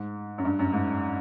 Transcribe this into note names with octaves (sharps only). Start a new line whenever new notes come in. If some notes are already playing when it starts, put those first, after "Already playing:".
Already playing: G#2
F#2
G2
F#2
G#2